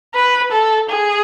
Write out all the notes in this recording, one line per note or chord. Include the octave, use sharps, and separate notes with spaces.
B4
A4
G#4